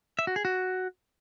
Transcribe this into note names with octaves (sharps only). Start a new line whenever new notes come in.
E5
F#4
G#4
F#4